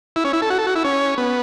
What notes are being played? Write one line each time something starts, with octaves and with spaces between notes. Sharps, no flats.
E4
C#4
E4
A4
F#4
A4
F#4
E4
C#4
B3